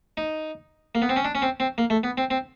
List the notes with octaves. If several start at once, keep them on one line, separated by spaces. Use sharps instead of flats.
D#4
A#3
B3
C4
C#4
D4
C#4
C4
C4
A#3
A3
B3
C4
C4